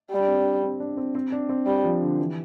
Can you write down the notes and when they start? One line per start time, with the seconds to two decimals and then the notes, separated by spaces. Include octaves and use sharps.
0.11 G3
0.20 D4
0.28 C4
0.37 D4
0.63 C4
0.80 D4
0.97 C4
1.15 C4
1.32 D4
1.49 C4
1.66 G3
1.84 F3
2.02 D3
2.19 E3